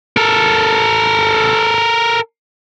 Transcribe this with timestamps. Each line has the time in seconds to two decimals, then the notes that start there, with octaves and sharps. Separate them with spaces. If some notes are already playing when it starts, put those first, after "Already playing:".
0.17 A4 A#4